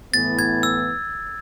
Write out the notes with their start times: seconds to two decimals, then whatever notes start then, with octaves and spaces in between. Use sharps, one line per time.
0.13 A2 E3 B3 A6
0.39 G#6
0.63 E6